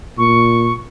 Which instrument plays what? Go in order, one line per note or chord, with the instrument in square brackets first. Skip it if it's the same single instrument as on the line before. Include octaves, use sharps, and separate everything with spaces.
[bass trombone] A#2 [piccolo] C#6